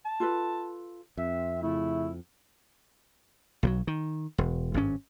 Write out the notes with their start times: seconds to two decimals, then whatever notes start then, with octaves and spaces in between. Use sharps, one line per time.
0.05 A5
0.20 F4 A4 B4
1.17 F2 C4 E5
1.62 C#3 A3 E4
3.63 B1 F3 F#3
3.87 D#3
4.38 E1
4.74 G#1 G2 C#4